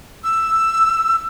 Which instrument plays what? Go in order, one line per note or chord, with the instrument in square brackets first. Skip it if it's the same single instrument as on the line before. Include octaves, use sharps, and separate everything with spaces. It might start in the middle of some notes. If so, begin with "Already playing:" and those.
[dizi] E6